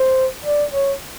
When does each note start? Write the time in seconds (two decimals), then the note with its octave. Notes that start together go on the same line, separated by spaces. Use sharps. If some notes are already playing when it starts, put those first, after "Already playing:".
Already playing: C5
0.45 D5
0.73 C#5